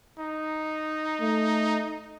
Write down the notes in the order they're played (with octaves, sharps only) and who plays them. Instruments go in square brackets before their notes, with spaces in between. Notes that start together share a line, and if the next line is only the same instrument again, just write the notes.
[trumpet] D#4
[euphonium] A3